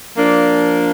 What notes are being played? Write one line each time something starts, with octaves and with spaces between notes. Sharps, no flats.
F3 A#3 D4